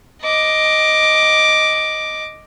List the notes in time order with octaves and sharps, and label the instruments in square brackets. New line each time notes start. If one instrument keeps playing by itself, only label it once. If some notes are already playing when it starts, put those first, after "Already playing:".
[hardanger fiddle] D#5 D6